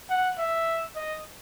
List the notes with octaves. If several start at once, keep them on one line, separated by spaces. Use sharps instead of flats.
F#5
E5
D#5